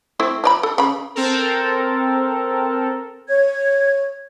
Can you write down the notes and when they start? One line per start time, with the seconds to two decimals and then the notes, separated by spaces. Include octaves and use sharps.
0.20 A3 C4 E4
0.44 F3 D5 B5
0.63 A4
0.78 C#3 B5
1.15 C4 A4 A#4
3.28 C#5 G#6